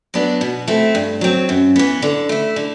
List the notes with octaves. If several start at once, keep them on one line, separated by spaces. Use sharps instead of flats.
F#3 B3 D4
B2
A3 C4 E4
G2
F#3 C4
F#2
E3 B3
D3
A3 E4
D3